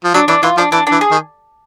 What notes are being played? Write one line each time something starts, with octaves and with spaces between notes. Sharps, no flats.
F3
F#3 D4
E3 D4
E3 F4
F3 D4
E3 D4
E3 D4
G#4
D#3